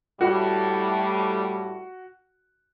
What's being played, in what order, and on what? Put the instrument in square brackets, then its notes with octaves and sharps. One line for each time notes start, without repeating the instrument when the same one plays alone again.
[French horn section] A2 G3 [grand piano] F#4